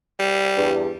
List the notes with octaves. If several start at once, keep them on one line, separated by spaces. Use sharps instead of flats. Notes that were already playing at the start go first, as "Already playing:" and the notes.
G3
E2 G2